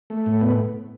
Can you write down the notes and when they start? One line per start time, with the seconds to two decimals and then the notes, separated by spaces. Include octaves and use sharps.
0.10 A3
0.26 A2
0.41 B3